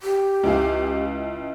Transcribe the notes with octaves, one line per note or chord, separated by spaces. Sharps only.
G4
C#2 E4 F5